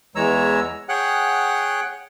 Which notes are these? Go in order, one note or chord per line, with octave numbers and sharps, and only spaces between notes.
E2 E3 G#3 C#5 A#5 E6
G#4 C#5 F#5 G5 F#6